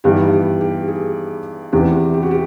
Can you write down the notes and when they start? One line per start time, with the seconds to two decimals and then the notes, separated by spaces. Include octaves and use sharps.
0.04 G2 E3 G3 B3 D#4 G4
0.33 G4
0.61 G4
0.88 G#4
1.72 E2 C3 E3 G4
2.14 G4
2.23 F#4
2.31 G4